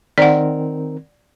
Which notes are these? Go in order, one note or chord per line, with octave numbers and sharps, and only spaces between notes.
D#3 C4 A#4 D5 F#5